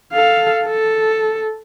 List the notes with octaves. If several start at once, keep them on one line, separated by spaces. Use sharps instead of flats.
A4 F5
A4